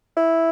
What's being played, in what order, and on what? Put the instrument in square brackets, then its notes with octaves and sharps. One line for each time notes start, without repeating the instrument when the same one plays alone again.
[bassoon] E4